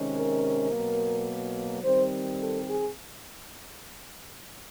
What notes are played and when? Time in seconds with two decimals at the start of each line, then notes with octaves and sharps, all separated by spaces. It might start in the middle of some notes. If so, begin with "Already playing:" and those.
Already playing: C3 D#3 G#3 C#4
0.16 A#4
0.71 B2 F#3 A#3
1.84 D#3 G3 C4 C5
2.40 A4
2.68 G#4